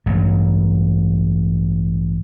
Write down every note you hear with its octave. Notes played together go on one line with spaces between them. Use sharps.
A1 G2